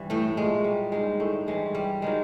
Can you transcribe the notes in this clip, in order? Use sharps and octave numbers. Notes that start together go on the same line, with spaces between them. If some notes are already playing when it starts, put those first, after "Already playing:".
Already playing: G2 E3 G3
A2 A3
A#2 F#3 G#3
G3
G2 D#3 G3 G#3
A2 A3
G2 E3 G3 G#3
G3
D#3 F#3 G#3